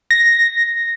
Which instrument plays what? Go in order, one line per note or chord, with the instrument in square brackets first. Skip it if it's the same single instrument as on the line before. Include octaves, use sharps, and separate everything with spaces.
[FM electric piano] A#6